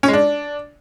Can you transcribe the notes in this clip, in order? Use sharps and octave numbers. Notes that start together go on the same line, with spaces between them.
C#4
G#3
D4